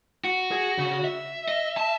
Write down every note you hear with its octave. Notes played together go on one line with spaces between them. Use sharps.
F#4
G#4 G#5
C#3
E5
D#5
A5